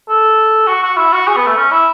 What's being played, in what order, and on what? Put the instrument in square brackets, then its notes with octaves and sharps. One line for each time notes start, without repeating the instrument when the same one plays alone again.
[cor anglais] A4
F#4
F#4
E4
F#4
G#4
B3
A3
C#4
E4